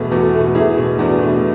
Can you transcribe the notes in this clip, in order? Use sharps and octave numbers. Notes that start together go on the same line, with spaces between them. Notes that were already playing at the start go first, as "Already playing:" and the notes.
Already playing: E2 B2 A3 G#4 B4
E2 F#4 A4
B2 A3
E2 E4 G#4
B2 A3
E2 D4 F#4
B2 A3